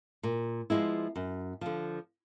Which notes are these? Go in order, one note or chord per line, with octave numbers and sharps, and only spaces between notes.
A#2
F3 G#3 B3 E4
F#2
D3 F3